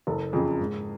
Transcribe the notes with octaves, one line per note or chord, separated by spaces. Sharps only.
F#1 A4
F2 C#3 G#4
G#2